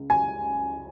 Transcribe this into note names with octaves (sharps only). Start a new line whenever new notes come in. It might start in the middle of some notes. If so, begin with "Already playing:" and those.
Already playing: C#2
G#5